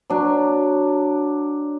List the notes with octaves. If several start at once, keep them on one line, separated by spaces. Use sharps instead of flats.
F#3 D4